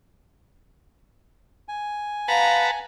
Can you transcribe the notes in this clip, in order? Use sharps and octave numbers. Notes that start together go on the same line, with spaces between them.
G#5
B4 F5 F#5 A5 A#5